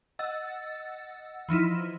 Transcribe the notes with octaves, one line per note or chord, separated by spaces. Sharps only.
D#5 F#5 E6 A6
E3 F3 D#4 E4